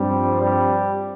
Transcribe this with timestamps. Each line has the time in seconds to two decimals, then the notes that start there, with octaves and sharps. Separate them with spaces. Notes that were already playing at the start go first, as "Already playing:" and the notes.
Already playing: G2 F3 G3 C4
0.42 G3